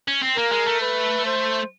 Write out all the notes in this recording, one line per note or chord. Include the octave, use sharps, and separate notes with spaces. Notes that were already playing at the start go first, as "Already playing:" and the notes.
C#4
C4
A#3 A#4
G#3
A3
B4
C5